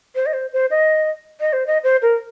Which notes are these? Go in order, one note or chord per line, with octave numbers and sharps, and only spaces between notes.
C5
D#5
C5
C5
D#5
D#5
C5
D#5
C5
A#4